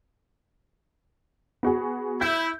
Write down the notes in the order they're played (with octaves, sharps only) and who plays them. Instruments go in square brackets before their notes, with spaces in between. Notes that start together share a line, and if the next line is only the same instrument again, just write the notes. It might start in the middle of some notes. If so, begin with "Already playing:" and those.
[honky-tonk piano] B3 F#4 G#4
[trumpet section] E4 [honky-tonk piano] G6